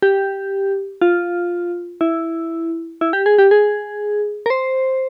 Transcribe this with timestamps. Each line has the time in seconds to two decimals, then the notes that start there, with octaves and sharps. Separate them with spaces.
0.02 G4
1.02 F4
2.01 E4
3.01 E4
3.13 G4
3.26 G#4
3.38 G4
3.51 G#4
4.46 A#4
4.50 C5